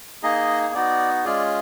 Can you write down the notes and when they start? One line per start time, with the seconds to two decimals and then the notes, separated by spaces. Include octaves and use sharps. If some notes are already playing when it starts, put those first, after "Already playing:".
0.23 A#3 D#4 G#4 D#5
0.74 B3 D#4 F#4 D5
1.25 G#3 C#4 F4 G#4 D5